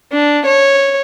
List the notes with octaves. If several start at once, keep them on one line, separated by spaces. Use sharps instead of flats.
D4
C#5